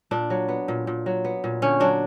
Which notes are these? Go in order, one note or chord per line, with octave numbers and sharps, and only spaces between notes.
A#2 D4
F#3
B3
A#2
A#2
F#3
B3
A#2
D3 C#4
F#3 D4